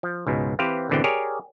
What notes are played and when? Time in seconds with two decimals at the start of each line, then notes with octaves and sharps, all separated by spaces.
0.03 F3
0.27 C#2 G#2 B2
0.59 E3 C4 G4 B4 C5 F5
0.89 G#1 B2 D3 E3 C4 G5
1.04 G4 G#4 A#4 C#5 D5